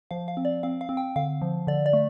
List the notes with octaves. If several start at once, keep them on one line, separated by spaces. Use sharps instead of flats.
F3 F5
F5
C4
D5
C4 F5
F5
C4
G5
D3 F5
F3
D3 D5
D5
A3